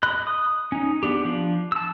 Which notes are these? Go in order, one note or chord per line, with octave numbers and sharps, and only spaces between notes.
D#5 B5 F#6
D#6
C#4 D#4
B3 D4 G4
F3 D4
A5 E6